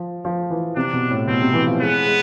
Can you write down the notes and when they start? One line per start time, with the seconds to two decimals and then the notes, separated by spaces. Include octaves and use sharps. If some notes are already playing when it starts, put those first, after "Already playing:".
Already playing: F3
0.25 F3
0.51 E3
0.76 C3 D4
0.93 B2
1.11 A2
1.28 B2 C4
1.41 C3
1.54 E3
1.67 F3
1.81 G#3 B3
2.07 G#3